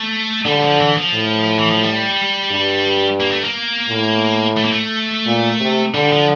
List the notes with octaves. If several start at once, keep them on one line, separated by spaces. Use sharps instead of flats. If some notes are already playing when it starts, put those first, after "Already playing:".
Already playing: A3
D3 G3
F3
E3
F3
A2
E3
F3
G3
G2
A#3
A3
A#3
A2
A3
A#3
A3
A#2
C3
D3 G3
F3